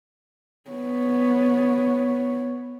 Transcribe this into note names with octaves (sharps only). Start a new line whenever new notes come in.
B3 C#5